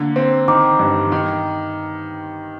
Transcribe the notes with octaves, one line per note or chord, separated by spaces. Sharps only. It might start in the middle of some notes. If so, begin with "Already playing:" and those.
Already playing: D3 A#3
C4
D#3 A#5 D6
G2
D#3